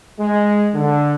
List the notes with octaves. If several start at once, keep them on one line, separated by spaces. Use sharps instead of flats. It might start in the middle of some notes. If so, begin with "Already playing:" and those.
G#3
D3